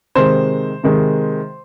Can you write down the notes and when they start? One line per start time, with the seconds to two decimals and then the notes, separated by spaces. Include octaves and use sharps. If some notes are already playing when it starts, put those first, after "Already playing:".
0.15 C3 D#3 G#3 C5
0.84 C3 D#3 G#3